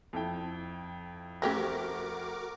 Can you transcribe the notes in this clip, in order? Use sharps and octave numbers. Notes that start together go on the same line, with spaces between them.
F2 E4 G5
A3 C4 C#4 F#4 G4 A#4 D6 A#6